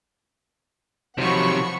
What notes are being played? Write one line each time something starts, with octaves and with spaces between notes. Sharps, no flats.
C3 D#3 F3 F#3 F#5 B5 C#6